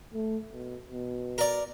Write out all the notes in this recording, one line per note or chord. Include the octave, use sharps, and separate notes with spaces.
A3
B2
B2
A#4 D5